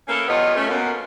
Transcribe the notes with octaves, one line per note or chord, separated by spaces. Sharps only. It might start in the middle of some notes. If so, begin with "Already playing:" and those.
E3 A#3 C#4 A4 A#4
E2 G3 B3 F4 C#5 D#5
A3 C#4
F#2 A#3 B3